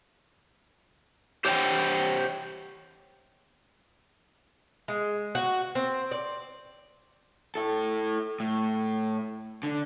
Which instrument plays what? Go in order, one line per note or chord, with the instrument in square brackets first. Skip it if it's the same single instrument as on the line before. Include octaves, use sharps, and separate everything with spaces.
[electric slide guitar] G4 C5 C#5 F#5 G5
[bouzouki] G#3
F#4
C4
D5
[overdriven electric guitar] E4 A4
A2
D3